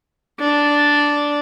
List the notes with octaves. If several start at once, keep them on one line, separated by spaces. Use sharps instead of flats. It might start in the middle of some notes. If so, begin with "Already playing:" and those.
D4